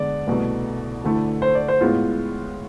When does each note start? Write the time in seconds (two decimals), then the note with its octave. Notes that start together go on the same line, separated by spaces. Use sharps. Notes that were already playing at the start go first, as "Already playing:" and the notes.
Already playing: D3 G#3 B3 D5
0.27 C2 B2 A3
1.04 D2 D3 A3 E4
1.42 C5
1.55 D5
1.68 C5
1.81 A2 G#3 B3 F4